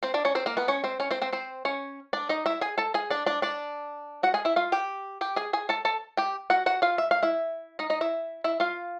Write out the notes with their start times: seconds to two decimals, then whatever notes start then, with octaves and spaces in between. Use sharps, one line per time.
0.03 C4 C5
0.14 D4 D5
0.25 C#4 C#5
0.35 C4 C5
0.46 A#3 A#4
0.57 B3 B4
0.68 C#4 C#5
0.84 C4 C5
1.00 C#4 C#5
1.11 C4 C5
1.22 C4 C5
1.33 C4 C5
1.65 C#4 C#5
2.13 D4 D5
2.29 D#4 D#5
2.46 E4 E5
2.61 G#4 G#5
2.78 A4 A5
2.94 G#4 G#5
3.10 D4 D5
3.26 D4 D5
3.42 D4 D5
4.23 F#4 F#5
4.34 G#4 G#5
4.45 E4 E5
4.56 F4 F5
4.72 G4 G5
5.21 G4 G5
5.36 G#4 G#5
5.53 G#4 G#5
5.69 A4 A5
5.85 A4 A5
6.17 G4 G5
6.50 F#4 F#5
6.66 F#4 F#5
6.82 F4 F5
6.98 E5
7.11 F5
7.23 E4 E5
7.79 D#4 D#5
7.90 D#4 D#5
8.01 E4 E5
8.44 E4 E5
8.60 F4 F5